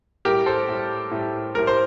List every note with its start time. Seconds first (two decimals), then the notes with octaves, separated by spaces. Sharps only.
0.25 A2 G3 G4 A#4
0.46 A4 C5
0.69 A2 G3
1.11 A2 G3
1.54 A2 G3 A#4
1.67 C5